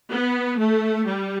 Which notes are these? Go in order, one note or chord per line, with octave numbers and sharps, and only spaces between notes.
B3
A3
G3